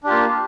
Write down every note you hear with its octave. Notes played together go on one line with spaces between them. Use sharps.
A#3 D4 F4 G4